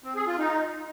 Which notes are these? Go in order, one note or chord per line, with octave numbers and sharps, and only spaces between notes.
C4
G#4
F4
D#4